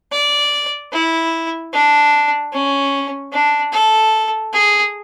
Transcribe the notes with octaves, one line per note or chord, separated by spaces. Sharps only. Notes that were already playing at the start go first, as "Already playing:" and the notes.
D5
E4
D4
C#4
D4
A4
G#4